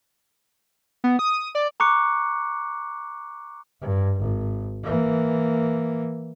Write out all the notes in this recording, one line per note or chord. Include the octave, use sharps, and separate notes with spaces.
B3
D#6
D5
A#5 C#6 D6 F#6 C#7
G2
G#1
E3 A#3